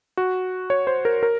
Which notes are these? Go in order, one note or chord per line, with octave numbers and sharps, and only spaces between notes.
F#4
C#5
C5
A#4
A#4